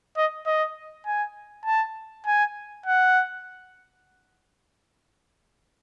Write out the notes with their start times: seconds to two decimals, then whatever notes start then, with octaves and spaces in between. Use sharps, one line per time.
0.17 D#5
0.46 D#5
1.06 G#5
1.66 A5
2.26 G#5
2.86 F#5